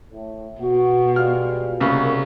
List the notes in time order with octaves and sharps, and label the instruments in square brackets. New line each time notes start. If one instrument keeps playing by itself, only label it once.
[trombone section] A2
[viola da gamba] B2 [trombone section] F#4
[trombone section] G3 G#3 F4 [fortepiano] F6
[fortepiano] C2 C#3 [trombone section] A#3 B3